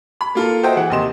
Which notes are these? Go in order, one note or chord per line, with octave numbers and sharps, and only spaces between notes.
B5
A#3 F4 A4
F#4 C5 D#5 E5 G5
E3 G#4 F#5
D#2 C3 D#5 C6 E7